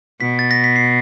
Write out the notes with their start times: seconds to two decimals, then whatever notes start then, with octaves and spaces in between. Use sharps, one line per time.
0.21 B2 B6
0.39 A6
0.51 A#6
0.64 B6
0.76 C7